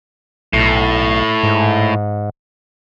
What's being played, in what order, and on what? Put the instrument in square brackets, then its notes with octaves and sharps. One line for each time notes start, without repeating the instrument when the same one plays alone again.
[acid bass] B1 [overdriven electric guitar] A2
[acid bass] G#2